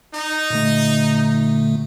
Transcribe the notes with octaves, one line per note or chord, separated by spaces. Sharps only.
D#4
A#2 D3 A3